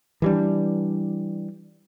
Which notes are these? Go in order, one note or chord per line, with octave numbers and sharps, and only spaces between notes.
E3 G3 D4